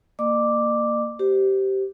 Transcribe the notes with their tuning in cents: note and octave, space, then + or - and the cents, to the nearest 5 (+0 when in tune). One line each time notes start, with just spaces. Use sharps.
A#3 -15 D5 +45 D6 +0
G4 -20 C5 -5